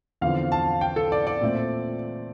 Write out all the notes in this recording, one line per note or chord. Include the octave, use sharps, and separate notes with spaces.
E2 D3 F3 C4 F5
A5
G5
A4
D5
D5
A#2 A3 C4